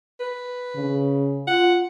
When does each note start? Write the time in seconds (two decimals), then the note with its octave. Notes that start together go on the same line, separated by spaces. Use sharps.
0.20 B4
0.75 C#3
1.48 F4 F#5